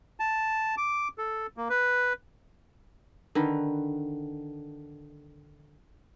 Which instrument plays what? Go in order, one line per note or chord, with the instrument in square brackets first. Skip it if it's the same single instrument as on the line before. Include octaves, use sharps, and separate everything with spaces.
[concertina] A5
D6
A4
A#3
B4
[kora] D3 D#3 B4